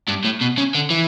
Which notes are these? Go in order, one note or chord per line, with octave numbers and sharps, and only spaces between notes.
G2
A2
B2
C#3
D3
E3